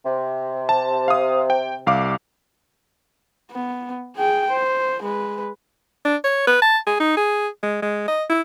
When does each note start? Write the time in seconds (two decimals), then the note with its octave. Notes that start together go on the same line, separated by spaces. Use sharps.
0.05 C3
0.69 A5
1.08 F5 D#6
1.50 G5
1.87 C2 F5 D6
3.52 B3
4.16 G#4 G5
4.51 C5
5.03 G#3 B4
6.05 D4
6.24 C#5
6.47 B4
6.62 A5
6.87 G#4
7.00 D#4
7.17 G#4
7.63 G#3
7.82 G#3
8.08 D#5
8.30 E4